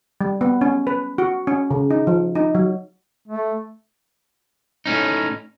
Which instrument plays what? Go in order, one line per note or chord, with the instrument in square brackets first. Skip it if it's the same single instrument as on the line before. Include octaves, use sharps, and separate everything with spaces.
[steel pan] G3
B3
C#4
B4
F#4
C#4
C#3
D#4
F3
D#4
F#3
[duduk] A3
[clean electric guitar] A2 C#4 D#4